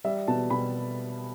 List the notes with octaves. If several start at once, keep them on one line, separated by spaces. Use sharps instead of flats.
G3 E5
B2 A5
B2 B5